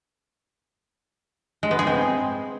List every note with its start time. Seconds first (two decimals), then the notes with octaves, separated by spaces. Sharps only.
1.63 G#3
1.71 B3
1.79 G#4
1.87 C4